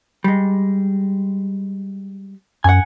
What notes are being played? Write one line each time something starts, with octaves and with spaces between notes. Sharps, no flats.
G3 G#3
F#2 F#5 G#5